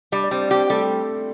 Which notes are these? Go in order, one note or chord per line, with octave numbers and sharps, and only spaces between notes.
G3 D4 D5
D5
G3 C4 C5
D5
C4 G4 C5
G3 A3 A4